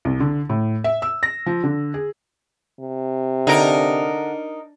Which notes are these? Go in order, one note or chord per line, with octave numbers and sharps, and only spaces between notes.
C2
D3
A2
E5
E6
A#6
F3
D3
G#4
C3
D3 D#4 A#4